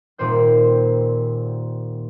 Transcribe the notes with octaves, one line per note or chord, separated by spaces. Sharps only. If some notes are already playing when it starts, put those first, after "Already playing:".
D#1 A#2 C4 C5 G6